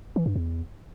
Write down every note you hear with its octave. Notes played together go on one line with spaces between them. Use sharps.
E3
G2
E2